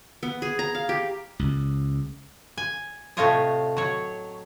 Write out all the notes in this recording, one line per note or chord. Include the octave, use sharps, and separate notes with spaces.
B3
G#4
A#5
F5
G4
C#2
G#5
A2 C3 A3 F4 C#5 D#5
F#3 C#5